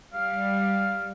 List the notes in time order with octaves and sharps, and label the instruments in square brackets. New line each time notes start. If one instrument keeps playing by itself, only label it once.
[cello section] G3 [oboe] F5